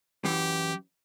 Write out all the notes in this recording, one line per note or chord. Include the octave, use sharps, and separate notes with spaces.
F#2 E3 G4